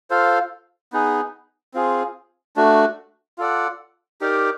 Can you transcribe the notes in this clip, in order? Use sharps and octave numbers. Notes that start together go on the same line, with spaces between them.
F4 A4 C5 F5
B3 D#4 G#4
C4 F4 G#4
A3 D4 F#4
F4 A4 D5 F#5
D#4 G4 A#4 D5